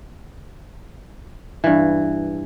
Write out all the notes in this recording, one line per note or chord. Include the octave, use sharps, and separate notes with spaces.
G2 E3